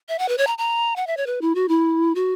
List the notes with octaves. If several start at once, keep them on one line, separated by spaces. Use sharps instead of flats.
E5
F#5
B4
C#5
A#5
A#5
F#5
E5
C#5
B4
E4
F#4
E4
F#4